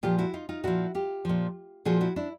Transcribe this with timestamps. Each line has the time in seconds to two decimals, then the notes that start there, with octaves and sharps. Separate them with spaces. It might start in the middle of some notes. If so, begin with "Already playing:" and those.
0.03 A#2 F3 F4 G4
0.18 E4 F#4
0.33 D#4 F4
0.49 D#4 F4
0.64 A#2 F3 E4 F#4
0.95 F4 G4
1.25 A#2 F3
1.85 A#2 F3 F#4 G#4
2.01 E4 F#4
2.16 D4 E4